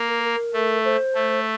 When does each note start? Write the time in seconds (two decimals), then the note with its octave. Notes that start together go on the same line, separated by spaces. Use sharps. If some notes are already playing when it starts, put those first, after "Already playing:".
Already playing: A#3
0.08 A#4
0.23 A#4
0.54 A3
0.84 C5
1.15 A3